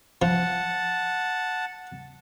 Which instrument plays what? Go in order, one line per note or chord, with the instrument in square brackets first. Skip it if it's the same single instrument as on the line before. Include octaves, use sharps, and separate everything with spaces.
[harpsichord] F3 [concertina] F#5 A5